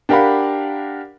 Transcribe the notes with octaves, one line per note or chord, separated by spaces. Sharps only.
D4 G4 A#4 F5 F#5 B5